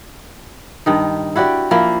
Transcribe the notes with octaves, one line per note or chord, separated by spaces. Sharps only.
G2 D#3 D#4
E4 F#4 G4 D5
F3 A#3 E4